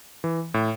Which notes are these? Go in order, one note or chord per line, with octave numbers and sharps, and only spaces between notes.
E3
A2